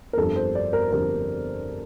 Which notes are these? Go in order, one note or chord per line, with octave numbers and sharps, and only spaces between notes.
A#4
G1 F2 D3 G3 A4
C5
D5
A#4
G1 F2 D3 G3 A#4